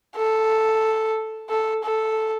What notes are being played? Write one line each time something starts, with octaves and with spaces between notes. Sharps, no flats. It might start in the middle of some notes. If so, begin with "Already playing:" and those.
A4
A4
A4